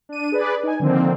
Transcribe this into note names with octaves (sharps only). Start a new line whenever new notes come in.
D4 D#7
G#4 B4 D5
D#4 G#5
D3 D#3 F3 A#3 C4